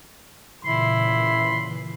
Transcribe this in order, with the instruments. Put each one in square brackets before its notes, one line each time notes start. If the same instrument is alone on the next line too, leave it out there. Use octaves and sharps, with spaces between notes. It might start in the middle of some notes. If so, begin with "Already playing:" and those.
[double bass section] A#2 C#3 E3 [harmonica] E4 B5 C6